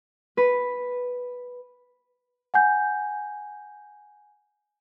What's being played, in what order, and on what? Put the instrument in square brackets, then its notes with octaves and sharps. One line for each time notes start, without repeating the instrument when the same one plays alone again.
[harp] B4
[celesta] F#5 G#5 G6